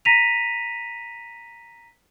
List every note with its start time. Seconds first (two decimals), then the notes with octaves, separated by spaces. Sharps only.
0.05 A#5 A#6 B6 D#7 F7